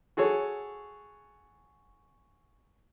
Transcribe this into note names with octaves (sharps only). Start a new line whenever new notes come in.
F#4 G#4 A4 C#5